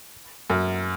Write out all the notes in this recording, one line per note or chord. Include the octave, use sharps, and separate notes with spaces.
F#2